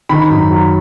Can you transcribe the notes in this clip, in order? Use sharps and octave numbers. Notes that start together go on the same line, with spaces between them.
D#3 B5
F#2
F#3